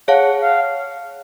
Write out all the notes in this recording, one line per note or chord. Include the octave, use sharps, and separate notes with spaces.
G#4 C#5 F5 F#5 A5
F5